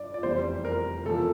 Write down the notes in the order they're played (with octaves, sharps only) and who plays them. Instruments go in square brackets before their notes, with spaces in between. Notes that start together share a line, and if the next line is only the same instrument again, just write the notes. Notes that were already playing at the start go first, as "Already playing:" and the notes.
Already playing: [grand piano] G2 D4 D5
D5
F1 E2 C3 G3 C5
A#4
E2 C3 F3 A3 A4